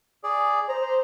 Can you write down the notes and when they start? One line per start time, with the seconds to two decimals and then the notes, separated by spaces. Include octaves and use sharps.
0.24 G#4 D5
0.69 C5 A#5